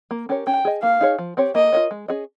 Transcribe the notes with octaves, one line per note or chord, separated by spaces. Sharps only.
A#3
C#4 G4 A#4 C#5
C#4 G5
G#4 D#5
A#3 F5
D#4 G#4 C#5
F3
C4 G4 C#5
A#3 D#5
F4 A#4 C#5
G#3
C#4 G#4 D#5